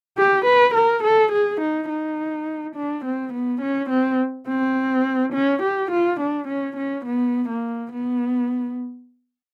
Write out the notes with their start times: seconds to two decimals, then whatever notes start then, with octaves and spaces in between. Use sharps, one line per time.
0.18 G4
0.46 B4
0.75 A#4
1.04 A4
1.32 G#4
1.61 D#4
1.89 D#4
2.76 D4
3.05 C4
3.33 B3
3.62 C#4
3.90 C4
4.48 C4
5.33 C#4
5.63 G4
5.92 F4
6.21 D4
6.48 C#4
6.77 C#4
7.05 B3
7.49 A#3
7.92 B3